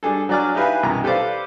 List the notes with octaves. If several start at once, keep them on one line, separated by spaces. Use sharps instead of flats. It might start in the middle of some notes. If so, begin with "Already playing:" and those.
G3 D4 G#4 A4
F#3 D4 F#4 D5 G#5 F6
D#4 E4 G4 B4 F5 G#5
C2 F#2 B2 E3 A#5
G4 A4 B4 C5 D5 F5